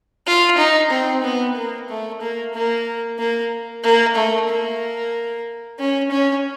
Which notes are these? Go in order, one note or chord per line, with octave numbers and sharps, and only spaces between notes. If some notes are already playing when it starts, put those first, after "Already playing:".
F4
D#4
C4
B3
A#3
A3
A#3
A#3
A#3
A#3
A3
A#3
C#4
C#4